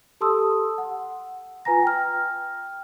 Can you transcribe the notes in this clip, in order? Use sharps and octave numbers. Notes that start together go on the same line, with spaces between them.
G4 A4 A5 C6 D#6 E6
F#5
F4 B4 G#5 A#5 A#6
G5 F6